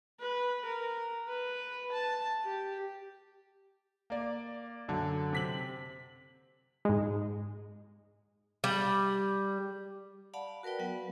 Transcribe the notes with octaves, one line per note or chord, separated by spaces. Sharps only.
B4
A#4
B4
A5
G4
A#3 D5
F#2 D3
C3 B6 F#7
G#2 G#3
G3
D5 F5 F#5 A5 B5
F#4 A#4 B4 D5 G5
F#3 B3 F#5